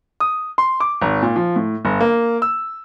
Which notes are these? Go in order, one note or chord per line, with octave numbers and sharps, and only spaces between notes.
D#6
C6
D6
G#1
A#2
F3
A2
G1
A#3
E6